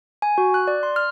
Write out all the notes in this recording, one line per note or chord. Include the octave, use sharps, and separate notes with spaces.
G#5
F#4
F#6
D5
C6
F6